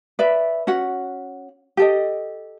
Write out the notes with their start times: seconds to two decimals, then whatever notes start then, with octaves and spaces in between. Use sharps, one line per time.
0.19 B4 D5 E5
0.67 C#4 F#4 F#5
1.77 G4 A4 D#5